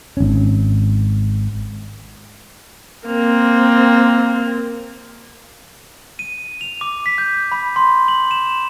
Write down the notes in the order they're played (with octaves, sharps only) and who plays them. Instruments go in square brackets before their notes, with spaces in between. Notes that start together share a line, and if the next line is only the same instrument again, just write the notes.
[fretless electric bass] G#1 C#4
[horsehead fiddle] A#3 C4
[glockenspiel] D#7
F7
D6
B6
G6
B5
C6
F#7
E7